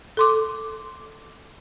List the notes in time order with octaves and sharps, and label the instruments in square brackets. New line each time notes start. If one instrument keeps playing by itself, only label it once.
[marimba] A4 C6 D6